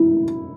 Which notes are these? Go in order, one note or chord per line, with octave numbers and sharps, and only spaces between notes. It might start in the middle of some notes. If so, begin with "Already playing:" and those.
Already playing: E4